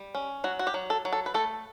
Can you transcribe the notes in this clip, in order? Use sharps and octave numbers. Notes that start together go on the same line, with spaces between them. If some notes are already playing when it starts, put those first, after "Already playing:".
Already playing: G3
C#4
F#3 F#4
F#4
G4
F#3
A4
F#3
A4
B4
A3 A4